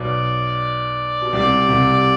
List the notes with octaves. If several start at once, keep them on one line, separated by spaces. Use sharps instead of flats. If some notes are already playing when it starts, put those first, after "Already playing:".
Already playing: B1 B2 D5
B2
C2 C3 D5
C2 C3